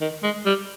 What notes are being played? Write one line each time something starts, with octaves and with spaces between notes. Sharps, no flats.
D#3
G#3
G3